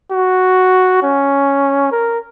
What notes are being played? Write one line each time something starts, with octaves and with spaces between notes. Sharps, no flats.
F#4
C#4
A#4